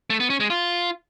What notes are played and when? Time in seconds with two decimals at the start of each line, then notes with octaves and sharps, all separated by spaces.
0.10 A3
0.20 B3
0.30 C#4
0.40 G#3
0.50 F4